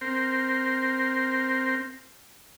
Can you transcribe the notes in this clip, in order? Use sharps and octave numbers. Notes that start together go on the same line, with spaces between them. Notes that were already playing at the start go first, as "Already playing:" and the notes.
C4 A#4 C5